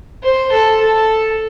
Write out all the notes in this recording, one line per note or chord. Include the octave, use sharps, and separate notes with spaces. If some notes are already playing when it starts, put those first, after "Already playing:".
C5
A4
A4